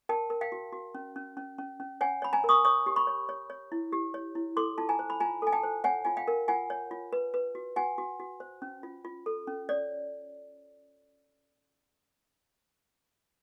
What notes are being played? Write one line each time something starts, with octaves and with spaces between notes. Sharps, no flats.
A#4 G5 A5
A#4
F5 G5
F#4
F#4
C#4
C#4
C#4
C#4
C#4
C#5 F#5 G#5
C#5 B5
G#5 A#5
A#4
C#6 D#6
C#5 C#6 D#6
G4
B5 C#6
C#5
C#5
C#5
E4
G4
C#5
E4
A4 C6 D6
F4 A5
G#5 A#5
C5
B5
F4 G#5 A#5
A4 G#5
G5 A5
C5
C#5 F#5 G#5
F4 G#5
F5 G5
A#4
F4 F#5 G#5
C#5
F4
B4
B4
F#4
F#4 F#5 G#5
F#4
F#4
C5
C#4
F4
F4
A4
C#4
C#5 D5